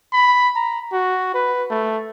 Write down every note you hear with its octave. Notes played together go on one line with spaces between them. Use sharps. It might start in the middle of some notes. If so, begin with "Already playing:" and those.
B5
A#5
F#4
B4
A3